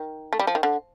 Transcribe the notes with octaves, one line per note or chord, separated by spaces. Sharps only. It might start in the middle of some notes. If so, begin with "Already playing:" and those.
Already playing: D#3
A3
G3
F3
D#3
D3